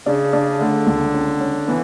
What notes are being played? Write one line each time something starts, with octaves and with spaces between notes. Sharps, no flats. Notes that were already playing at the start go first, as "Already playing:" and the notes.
C#3 D4
D4
D3 A3
C#2
C#4
C#4
E3 B3